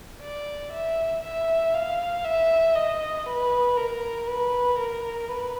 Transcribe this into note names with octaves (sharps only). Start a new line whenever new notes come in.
D5
E5
E5
F5
E5
D#5
B4
A#4
B4
A#4
B4